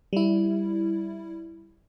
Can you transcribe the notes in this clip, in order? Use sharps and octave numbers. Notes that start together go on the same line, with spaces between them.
G3 E4